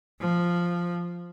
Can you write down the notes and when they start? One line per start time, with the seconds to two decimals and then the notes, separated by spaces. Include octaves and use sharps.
0.20 F3